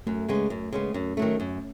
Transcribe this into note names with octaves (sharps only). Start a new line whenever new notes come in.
F#2 A3
C#3 G#3 B3
F#2
C#3 G#3 B3
F#2 C#4
D#3 F#3 A3
F#2